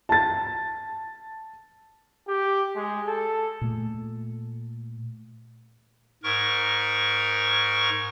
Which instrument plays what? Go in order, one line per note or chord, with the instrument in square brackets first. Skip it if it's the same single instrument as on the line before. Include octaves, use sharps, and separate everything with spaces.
[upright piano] A5 A6
[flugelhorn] G4
G#3
A4
[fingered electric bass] A#2 A3
[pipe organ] G#2 A#4 C#6